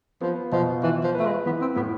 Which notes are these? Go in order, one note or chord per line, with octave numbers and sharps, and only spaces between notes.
F3 B3
B2 F3
E3 F4
F3
A3 B4
G#3
E3 B3
C4
A2 B3